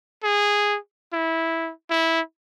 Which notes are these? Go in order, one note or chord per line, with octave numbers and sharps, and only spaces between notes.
G#4
E4
E4